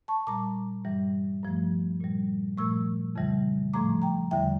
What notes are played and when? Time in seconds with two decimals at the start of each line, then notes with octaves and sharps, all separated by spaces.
0.08 A5 C#6
0.27 A#2 G3 A#5 D6
0.85 G2 E3 G3
1.43 G2 F3 A3
2.00 A#2 G3
2.58 A#2 F3 A3 C#6 E6
3.15 F2 C#3 E3 G3
3.74 A2 F3 A3 A#5 D6
4.02 G5 A#5
4.31 E2 D3 G3 E5 G5